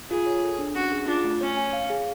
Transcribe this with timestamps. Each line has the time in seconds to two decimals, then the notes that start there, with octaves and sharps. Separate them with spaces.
0.10 F4 G#4
0.26 C#5
0.43 A4
0.59 D4
0.75 C#4 F#4
0.92 G#4
1.08 D4 F4
1.24 A3
1.41 C#4 C#5
1.57 G#5
1.73 F5
1.90 G#4